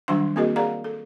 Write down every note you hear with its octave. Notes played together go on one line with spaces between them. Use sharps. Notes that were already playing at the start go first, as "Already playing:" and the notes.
D#3 F#3 G3 D4 F#5 C6
A#3 C4 F#4 G#4 A#4 D#5
G#4 A#4 D5 F5 F#5 A#5
A4